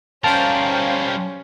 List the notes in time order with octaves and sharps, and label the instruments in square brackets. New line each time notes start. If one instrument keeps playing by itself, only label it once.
[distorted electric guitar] G3 A#4 [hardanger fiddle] C#4 [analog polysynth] C5 F5 G5 [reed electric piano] A5